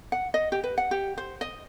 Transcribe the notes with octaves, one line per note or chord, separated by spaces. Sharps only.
F#5
D#5
G4
B4
F#5
G4
C5
D#5